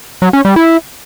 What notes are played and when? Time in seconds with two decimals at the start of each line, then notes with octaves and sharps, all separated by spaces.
0.22 F#3
0.33 C#4
0.45 G3
0.56 E4